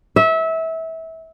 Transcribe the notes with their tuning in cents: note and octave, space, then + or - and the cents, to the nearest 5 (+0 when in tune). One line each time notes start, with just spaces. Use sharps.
E5 -25